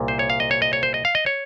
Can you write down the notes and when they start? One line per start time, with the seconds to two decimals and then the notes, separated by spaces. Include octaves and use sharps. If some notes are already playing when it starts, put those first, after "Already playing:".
Already playing: C2 A#2
0.08 C5
0.19 C#5
0.30 F5
0.40 D#5
0.51 C#5
0.62 D#5
0.73 C#5
0.83 C5
0.94 D#5
1.05 F5
1.15 D#5
1.26 C#5